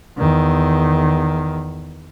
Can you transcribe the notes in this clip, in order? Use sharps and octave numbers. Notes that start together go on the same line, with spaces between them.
E2 D#3